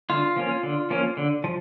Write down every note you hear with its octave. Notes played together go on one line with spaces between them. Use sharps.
D3 F4
F3 A#3 C#4
D3
F3 A#3 C#4
D3
F3